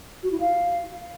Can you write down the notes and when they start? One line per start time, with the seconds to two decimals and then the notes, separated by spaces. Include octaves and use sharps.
0.23 F#4
0.32 E4
0.40 F5